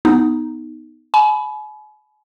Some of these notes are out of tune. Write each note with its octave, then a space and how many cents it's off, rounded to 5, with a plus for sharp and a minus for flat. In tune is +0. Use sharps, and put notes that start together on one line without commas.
B3 +0 D#4 +0
G#5 +40 B5 +0